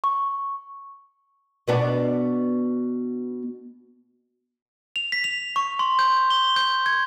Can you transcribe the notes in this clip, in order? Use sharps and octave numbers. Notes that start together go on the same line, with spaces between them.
C#6
B2 B3 D4
F7
B6
F7
C#6
C6
G6
G7
G6
G#6